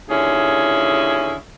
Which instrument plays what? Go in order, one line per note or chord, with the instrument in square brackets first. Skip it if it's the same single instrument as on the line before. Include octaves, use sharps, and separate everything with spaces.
[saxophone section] D#2 D3 C#4 E4 G#4